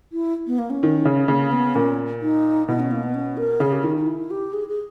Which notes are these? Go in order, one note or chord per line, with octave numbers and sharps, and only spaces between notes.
E4
B3
A#3
C#4
D#3
C#3
C#3 A#3
B3
A#2 C#4
D#4
B2 E4
C#4
A#3
B3
C#4
A#4
C#3 G#4
G4
D#3 D#4
D#4
E4
G4
G#4
G#4